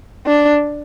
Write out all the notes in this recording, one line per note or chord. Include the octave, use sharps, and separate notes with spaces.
D4